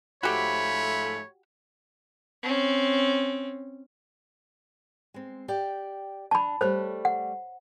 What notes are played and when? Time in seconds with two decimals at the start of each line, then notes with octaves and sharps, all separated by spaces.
0.23 G#2 F3 A3 F#4 G4 C#5 B5
2.43 C4 C#4
5.14 G#3 C4
5.48 G4 D5 G5
6.31 D4 A5 B5
6.61 G3 A3 C5 C#5
7.05 F#5